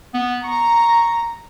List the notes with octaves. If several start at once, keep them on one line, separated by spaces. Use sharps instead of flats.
B3
A#5 C#6